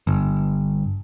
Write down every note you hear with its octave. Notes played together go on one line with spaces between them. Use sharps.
G1